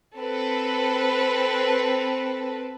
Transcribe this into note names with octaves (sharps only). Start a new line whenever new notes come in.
C4 A4 B4